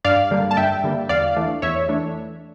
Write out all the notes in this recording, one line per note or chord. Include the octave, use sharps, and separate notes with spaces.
G2 D5 F5
D3 G3 A#3
A5
G2 E5 G5
D3 G3 A#3
E2 D5 F5
E3 A3 D4
E2 C#5 E5
E3 A3 D4